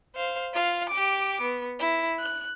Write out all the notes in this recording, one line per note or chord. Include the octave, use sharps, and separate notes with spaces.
C5 F5
F4 F5
G4 D6
B3
E4
F#6